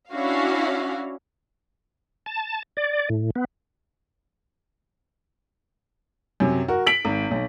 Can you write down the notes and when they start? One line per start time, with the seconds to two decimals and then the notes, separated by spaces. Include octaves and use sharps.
0.13 C#4 D4 E4 F#4 F5
2.26 A5
2.77 D5
3.10 A2
3.36 B3
6.40 F#2 C3 F#3
6.68 F#4 A#4
6.87 B6 D7 F#7
7.05 G#1
7.31 B1